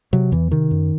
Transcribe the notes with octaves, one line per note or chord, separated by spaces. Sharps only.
C3 F#3
E2 E3
C3 D#3
F#2